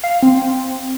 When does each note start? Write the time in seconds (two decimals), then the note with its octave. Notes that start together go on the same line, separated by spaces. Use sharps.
0.04 F5
0.23 C4